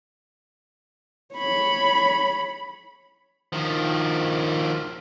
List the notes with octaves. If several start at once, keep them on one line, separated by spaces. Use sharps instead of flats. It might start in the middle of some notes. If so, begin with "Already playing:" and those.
C#5 B5
D#3 F3